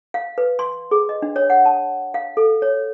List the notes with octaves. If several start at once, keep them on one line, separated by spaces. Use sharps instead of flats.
F5
B4
C6
G#4
D#5
D4
C#5
F#5
A5
F5
A4
C#5